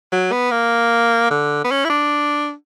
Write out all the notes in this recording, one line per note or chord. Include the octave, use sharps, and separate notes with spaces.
F#3
B3
A#3
D3
B3
C#4
E4
D4